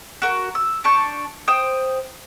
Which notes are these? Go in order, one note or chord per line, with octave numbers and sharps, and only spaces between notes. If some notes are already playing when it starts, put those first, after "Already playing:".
F#4 A#4
E6
D4 A5 C#6 G6
C5 G5 D#6 G6